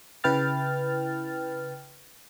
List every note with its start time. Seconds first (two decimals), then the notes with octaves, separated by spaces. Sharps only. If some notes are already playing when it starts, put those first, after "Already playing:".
0.24 C#3 E4 B4 G5 F6 A6